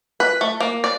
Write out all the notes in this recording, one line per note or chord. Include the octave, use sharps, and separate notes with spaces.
B4
A3
A#3
D5